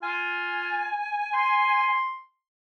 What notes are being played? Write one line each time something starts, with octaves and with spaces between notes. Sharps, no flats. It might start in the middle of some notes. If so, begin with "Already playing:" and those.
F4 G#5
C6